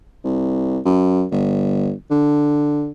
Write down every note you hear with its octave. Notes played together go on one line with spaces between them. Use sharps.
C2
F#2
G1
D3